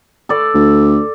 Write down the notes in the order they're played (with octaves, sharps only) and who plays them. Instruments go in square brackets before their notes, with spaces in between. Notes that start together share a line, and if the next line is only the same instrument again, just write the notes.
[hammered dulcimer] A4 D5
[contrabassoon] D2